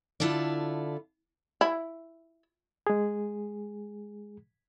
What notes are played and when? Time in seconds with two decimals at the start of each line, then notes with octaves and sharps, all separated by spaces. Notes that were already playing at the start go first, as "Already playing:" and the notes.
0.20 D3 E4 F4 A4 D5
1.61 E4
2.87 G#3 G#4